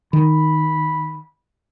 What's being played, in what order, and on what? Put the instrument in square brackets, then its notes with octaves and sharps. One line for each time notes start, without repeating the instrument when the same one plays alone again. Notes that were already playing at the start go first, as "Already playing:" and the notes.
[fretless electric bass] D#3 [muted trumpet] B5